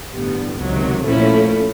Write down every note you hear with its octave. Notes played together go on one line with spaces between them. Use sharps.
A1 G2 D3 G3 B3
C#2 C3 D#3 F#3
A#2 F3 A3 C#4 E4